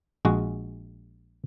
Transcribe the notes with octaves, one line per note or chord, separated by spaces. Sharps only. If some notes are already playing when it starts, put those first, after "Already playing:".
A#1 G#3 F#4